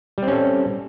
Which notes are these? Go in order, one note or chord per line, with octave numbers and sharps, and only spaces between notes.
G3 C4 C#4 A4